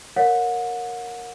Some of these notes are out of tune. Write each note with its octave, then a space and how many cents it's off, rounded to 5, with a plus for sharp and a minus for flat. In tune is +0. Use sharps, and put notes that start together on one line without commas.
A#4 +0 C#5 +0 F#5 -35